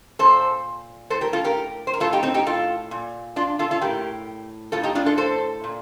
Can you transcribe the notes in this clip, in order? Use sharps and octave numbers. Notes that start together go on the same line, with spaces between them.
A#2 A4 C5
A2 A4 C5
G4 A#4
F4 A4
G4 A#4
C5
A#4
A2 F4 A4
D#4 G4
C4 D#4
D#4 G4
F4 A4
A#2
D4 F4
F4 A4
F4 A4
A2 G4 A#4
A2 F4 A4
D#4 G4
D4 F4
F4 A4
A4 C5
A#2